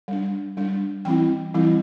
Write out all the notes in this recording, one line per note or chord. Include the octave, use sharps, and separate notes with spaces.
G3 D4
G3 D4
E3 G3 C4 E4 G5
E3 G3 C4 E4